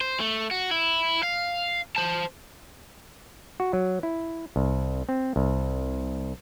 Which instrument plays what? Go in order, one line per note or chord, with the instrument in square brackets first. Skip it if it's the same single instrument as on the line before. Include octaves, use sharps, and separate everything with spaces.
[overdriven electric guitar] C5
A3
F#4
E4
F5
C5 A5
[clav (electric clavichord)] F#4
F#3
E4
C2
C4
C2